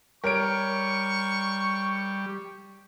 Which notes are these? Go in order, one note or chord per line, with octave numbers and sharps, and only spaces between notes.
G3 A#4 C#5 C#6 D7